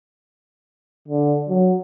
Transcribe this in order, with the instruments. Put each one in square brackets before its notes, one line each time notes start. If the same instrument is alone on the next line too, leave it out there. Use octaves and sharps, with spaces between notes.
[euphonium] D3
F#3